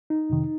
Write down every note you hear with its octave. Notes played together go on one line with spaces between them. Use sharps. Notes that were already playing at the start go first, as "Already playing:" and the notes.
D#4
F2 C3 D#3